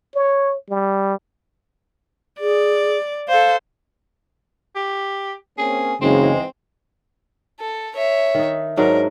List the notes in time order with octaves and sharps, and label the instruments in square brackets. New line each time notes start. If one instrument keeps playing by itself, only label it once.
[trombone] C#5
G3
[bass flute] G#4 [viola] D5
[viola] A4 C5 [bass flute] F5
[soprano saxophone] G4
[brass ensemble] A#3 C4 C#4 [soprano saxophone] G#4
[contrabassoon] F#1 [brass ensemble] G#2 E3 G#3 [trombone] C#3 [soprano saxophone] C4
[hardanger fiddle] A4
C#5 E5
[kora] D#3 D#4
[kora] G#2 F#3 D4 [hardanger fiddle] A#4